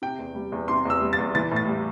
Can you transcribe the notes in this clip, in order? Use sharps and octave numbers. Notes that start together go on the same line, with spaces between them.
C3 G5
E2
G3
E2
C3 C6
E2 E6
G3
A6
E2
E3 A6
A2
A6
G3